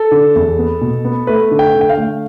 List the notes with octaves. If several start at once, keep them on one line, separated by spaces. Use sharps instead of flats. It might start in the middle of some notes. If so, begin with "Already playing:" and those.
Already playing: A4
D3
E2
B3
B2
B3
A3 B4
D3
G5
D3
G5
F5
A3